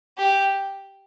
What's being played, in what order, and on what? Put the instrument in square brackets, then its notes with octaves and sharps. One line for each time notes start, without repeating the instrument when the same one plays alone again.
[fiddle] G4